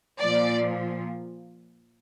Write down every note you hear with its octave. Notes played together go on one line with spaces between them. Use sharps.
A#2 F3 D5